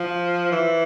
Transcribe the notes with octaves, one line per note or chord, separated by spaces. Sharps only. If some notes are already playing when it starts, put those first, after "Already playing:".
Already playing: F3
E3